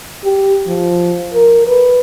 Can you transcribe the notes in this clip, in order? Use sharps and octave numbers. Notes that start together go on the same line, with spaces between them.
G4
F3
A#4
B4